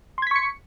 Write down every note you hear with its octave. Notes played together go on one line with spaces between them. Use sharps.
C6 C#6 G#6 B6 C#7